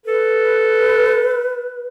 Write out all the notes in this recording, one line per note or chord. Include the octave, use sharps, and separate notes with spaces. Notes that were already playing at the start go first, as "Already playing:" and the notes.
A4 B4